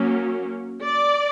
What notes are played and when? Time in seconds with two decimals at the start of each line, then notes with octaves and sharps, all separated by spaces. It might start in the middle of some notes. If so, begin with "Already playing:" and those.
Already playing: F#3 A#3 C#4
0.83 D5